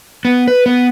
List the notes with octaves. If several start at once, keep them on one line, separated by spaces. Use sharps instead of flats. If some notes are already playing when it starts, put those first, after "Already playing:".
B3
B4
B3